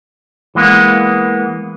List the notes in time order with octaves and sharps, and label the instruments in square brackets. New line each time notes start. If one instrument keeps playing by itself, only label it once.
[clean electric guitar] E3 G#3 A#3 B3